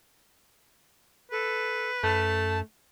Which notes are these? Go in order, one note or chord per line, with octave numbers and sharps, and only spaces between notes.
A4 B4
F#2 A3 A5